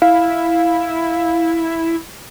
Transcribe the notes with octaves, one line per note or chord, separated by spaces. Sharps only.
E4 F5